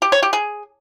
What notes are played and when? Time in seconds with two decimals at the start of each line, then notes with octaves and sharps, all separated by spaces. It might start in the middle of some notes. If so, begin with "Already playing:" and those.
0.02 G4
0.12 C#5
0.22 G4
0.33 G#4